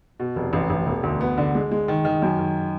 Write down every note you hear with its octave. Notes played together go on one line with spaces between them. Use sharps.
B2
F1
A1
A1
E1
D2
B3
D3
G#3
G#3
D#3
D#3
F#2
D#3